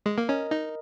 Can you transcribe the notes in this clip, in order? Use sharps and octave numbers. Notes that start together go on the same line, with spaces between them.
G#3
A#3
C#4 A#4 D#5
D#4